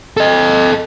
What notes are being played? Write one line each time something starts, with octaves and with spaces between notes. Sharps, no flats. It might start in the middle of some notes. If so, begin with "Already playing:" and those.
A4 D#5